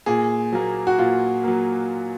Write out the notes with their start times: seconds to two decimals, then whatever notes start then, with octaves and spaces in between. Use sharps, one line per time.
0.06 A#2 G#4
0.53 F#3 A#3
0.87 F#4
0.99 A#2 F4
1.44 F#3 A#3